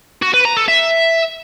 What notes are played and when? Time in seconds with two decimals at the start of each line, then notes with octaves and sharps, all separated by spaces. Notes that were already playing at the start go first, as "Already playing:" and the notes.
0.23 F#4
0.34 B4
0.45 A#5
0.57 A4
0.68 E5